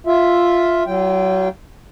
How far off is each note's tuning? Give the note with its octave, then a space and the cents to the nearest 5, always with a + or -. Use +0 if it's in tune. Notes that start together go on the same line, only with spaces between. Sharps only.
F4 +0 E5 +0
F#3 +30 F4 -25 G5 +0